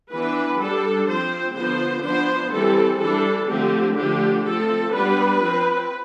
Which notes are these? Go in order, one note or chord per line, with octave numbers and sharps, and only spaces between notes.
E3 B3 D4 B4
G3 D4 A4
F3 C4 C5
D3 F3 B3 C5
F3 B3 D4 C5
E3 G3 C4 A4
E3 G3 D4 A4
D3 F3 A3 C4 G4
D3 F3 A3 D4 G4
F3 A3 C4 A4
G3 B3 D4 B4
F3 C4